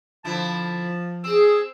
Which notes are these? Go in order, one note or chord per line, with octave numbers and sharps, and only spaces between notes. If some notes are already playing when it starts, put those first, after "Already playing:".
D3 F3 C4 E4 A5
C4 G#4 E6